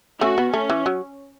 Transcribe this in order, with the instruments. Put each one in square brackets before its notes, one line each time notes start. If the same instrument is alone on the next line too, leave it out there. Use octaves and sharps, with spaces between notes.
[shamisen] A3 C#4 [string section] F#4
[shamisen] B3
[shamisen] A3 [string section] C#4
[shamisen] E3
F#3